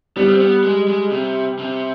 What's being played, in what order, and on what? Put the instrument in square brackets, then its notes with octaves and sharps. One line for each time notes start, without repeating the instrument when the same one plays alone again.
[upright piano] G3 [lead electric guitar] B3
[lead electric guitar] C4
B3
G#3
G#3
C3
C3